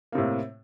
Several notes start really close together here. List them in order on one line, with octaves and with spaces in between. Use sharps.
A#3 C3 A2